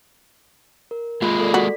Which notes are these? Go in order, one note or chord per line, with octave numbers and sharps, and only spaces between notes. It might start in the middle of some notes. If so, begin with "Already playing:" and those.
A#4
G#3 A#3 F4 B5
A4 D5
F#4 D5 B6